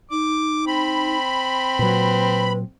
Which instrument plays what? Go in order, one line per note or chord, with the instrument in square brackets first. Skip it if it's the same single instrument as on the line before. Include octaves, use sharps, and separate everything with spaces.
[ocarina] D#4 [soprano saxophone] D6
[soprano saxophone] C4 [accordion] B5
[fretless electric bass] A#2 F#3 [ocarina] B4